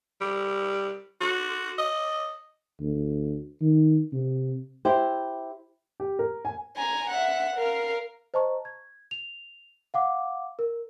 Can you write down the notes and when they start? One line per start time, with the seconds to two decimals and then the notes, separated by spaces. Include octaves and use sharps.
0.21 G3
1.20 F#4
1.78 D#5
2.81 D2
3.61 D#3
4.13 C3
4.85 E4 G4 C5
6.00 G4
6.19 A#4
6.45 G#5
6.76 G#5 A#5
7.10 E5 F#5
7.56 A#4 F5
8.34 C5 D#5 A5 A#5 C#6
8.65 G#6
9.11 F7
9.94 F5 F#5 D6
10.59 A#4